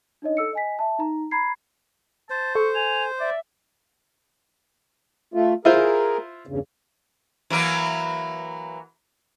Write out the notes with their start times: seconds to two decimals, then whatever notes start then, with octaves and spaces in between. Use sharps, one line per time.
0.22 D4 D#4 C#5 D#5
0.37 A4 E6 C#7
0.53 D#5 G#5 B6
0.79 E5 A5
0.99 D#4 A#5
1.31 A#5 B5 G#6 C7
2.30 C5 A5
2.55 A4 C#6
2.75 G#5 F7
3.20 D5 E5
5.34 A3 F4
5.65 E4 F4 G#4 A#4 C5
6.47 E2 G2 C#3
7.50 E3 F#3 A#3